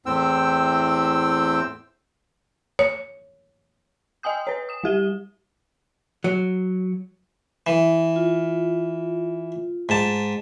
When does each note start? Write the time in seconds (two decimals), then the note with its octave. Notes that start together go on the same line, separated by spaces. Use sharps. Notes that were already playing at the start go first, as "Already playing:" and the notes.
0.06 E2 A2 C4 G5 E6
2.79 C#5
4.23 D#5 G5 G#5 D#6 G6
4.47 B4 C#5
4.69 D#6 E7
4.84 G3 G4 G7
6.24 F#3
7.67 E3
8.16 F4
9.89 G#2 A5